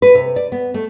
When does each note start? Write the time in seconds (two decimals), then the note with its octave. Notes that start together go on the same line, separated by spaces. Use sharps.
0.02 B4
0.15 C3
0.36 D5
0.52 B3
0.74 A3